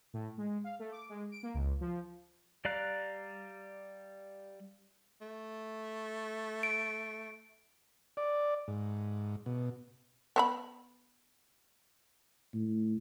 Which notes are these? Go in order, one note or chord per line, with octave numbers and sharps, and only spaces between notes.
A2
G#3
F5
A3
D6
G#3
D7
A#3
C#2
F3
G3 D5 F5 A#5 F#6
A3
D7
D5
G#2
B2
B3 C5 B5
A2